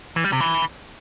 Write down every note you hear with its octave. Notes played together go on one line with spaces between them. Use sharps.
E3
G3
C3
E3